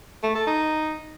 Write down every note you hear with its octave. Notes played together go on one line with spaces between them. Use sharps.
A3
A4
D#4